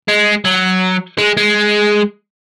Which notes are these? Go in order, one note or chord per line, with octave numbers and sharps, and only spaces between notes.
G#3
F#3
G#3
G#3